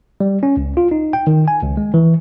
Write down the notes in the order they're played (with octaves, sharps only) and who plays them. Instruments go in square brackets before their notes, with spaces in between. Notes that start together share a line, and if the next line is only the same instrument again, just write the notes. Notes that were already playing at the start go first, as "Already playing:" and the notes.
[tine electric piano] G3
C#4
C#2
F4
D#4
G5
D#3
G#5
C#2
G#3
E3